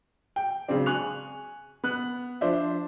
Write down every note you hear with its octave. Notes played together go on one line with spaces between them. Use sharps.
G5
C#3 F#3 G#3 C4 D4
G#5 C#6 F#6 F7
B3 F#6
F3 D4 C5 E5